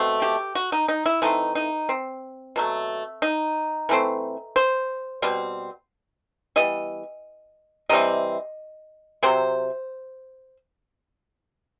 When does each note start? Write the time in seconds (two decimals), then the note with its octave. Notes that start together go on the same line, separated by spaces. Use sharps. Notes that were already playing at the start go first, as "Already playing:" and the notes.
Already playing: B2 A3 C4
0.22 G4
0.55 F#4
0.72 D#4
0.88 D#4
1.06 E4
1.22 E3 A3 C4 D#4
1.55 D#4
1.89 C4
2.56 B2 F#3 A3
3.22 D#4
3.89 E3 A3 C4
4.56 C5
5.22 B2 G3 C4
6.56 E3 G3 B3 D#5
7.89 C3 E3 G3 C4 D#5
9.23 C3 F#3 C4 C5